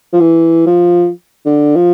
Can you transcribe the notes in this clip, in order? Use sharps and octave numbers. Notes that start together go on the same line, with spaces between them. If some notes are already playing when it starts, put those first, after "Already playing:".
F3
E3
F3
D3
F3